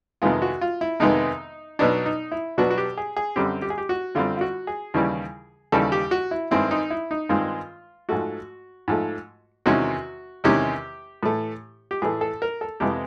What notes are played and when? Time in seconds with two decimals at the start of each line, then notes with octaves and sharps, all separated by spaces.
0.22 F2 C3 D#3 G#3 B3 F4
0.42 F#4
0.61 F4
0.81 E4
1.00 F2 C3 D#3 G#3 B3 D#4
1.79 B2 F#3 B3 D4 D#4
2.06 D#4
2.32 E4
2.58 B2 F#3 B3 D4 F#4
2.70 F#4
2.78 G4
2.97 G#4
3.16 G#4
3.36 F#2 D3 G3 C4 G4
3.62 G4
3.70 G#4
3.78 G4
3.89 F#4
4.15 F#2 D3 G3 C4 F4
4.37 F4
4.41 F#4
4.67 G#4
4.94 D#2 C#3 E3 G3
5.72 D#2 C#3 E3 G3 A4
5.92 G4
6.11 F#4
6.31 E4
6.51 G2 D#3 G#3 C4 E4
6.71 D#4
6.90 E4
7.11 D#4
7.29 G2 D#3 G#3 C4 F4
8.09 G#2 F3 A3 F#4
8.88 G#2 F3 A3
9.66 E2 C3 D#3 G#3 C#4 F#4
10.44 E2 C3 D#3 G#3 C#4 G4
11.23 A2 E3 A3
11.91 G4
12.02 A2 E3 A3 G#4
12.21 A4
12.42 A#4
12.61 A4
12.80 F2 C3 E3 G#3 B3 G4